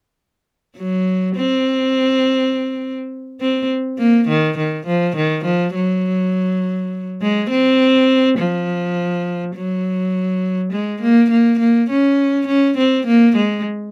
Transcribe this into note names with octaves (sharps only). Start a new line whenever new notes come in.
F#3
C4
C4
A#3
D#3
D#3
F3
D#3
F3
F#3
G#3
C4
F3
F#3
G#3
A#3
A#3
A#3
C#4
C#4
C4
A#3
G#3